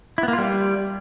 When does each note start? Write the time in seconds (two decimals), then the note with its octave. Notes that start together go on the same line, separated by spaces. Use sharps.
0.18 E4
0.23 B3
0.28 A#3
0.33 F4
0.38 G3